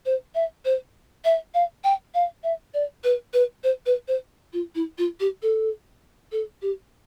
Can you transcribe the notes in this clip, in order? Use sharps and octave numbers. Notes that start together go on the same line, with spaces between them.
C5
E5
C5
E5
F5
G5
F5
E5
D5
B4
B4
C5
B4
C5
F4
E4
F4
G4
A4
A4
G4